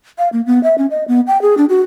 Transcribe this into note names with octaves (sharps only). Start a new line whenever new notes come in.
F5
A#3
B3
E5
C#4
D#5
B3
G5
G#4
D4
F#4